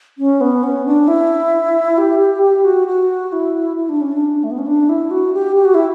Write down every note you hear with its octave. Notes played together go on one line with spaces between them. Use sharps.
C#4
B3
C#4
D4
E4
G4
G4
G4
F#4
F#4
E4
E4
D4
C#4
D4
A3
B3
C#4
D4
E4
F#4
G4
G4
F#4
E4